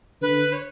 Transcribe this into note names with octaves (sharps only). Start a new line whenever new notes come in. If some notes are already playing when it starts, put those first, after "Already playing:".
D3 B4
C#5